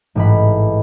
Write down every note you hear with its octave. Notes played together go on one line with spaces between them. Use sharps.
A1 G#2 E3 B5